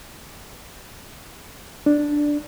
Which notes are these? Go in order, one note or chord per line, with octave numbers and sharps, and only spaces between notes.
D4